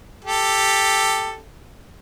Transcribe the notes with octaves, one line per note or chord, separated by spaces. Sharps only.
G4 A4